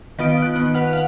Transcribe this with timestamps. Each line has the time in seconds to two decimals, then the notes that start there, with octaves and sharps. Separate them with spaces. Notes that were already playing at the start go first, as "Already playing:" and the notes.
0.19 D#3 B3 F4 D#6 D7
0.42 F#6
0.56 D#3 B3
0.74 B4 F#5 F6
0.93 F5 F#5